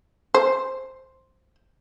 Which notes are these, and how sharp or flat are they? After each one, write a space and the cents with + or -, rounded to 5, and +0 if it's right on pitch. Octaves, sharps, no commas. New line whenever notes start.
C5 +5